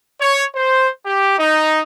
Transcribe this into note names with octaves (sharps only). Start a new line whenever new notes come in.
C#5
C5
G4
D#4